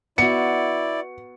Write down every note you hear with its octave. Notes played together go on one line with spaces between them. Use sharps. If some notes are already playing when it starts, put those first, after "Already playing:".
B3 E4 F#4 D5 C#7